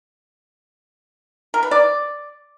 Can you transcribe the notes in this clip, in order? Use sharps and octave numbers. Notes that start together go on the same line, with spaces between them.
A#4
B4
D5